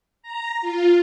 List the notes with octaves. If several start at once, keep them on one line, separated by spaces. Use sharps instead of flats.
A#5
F4